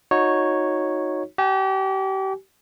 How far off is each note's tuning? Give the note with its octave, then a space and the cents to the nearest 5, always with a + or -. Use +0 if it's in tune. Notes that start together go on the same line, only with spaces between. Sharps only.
D#4 +0 F#4 -25 C#5 -5
G4 -35 G#5 +0